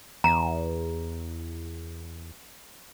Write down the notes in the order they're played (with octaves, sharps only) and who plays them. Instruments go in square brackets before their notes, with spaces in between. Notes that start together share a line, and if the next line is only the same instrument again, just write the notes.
[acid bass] E2 [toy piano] A#5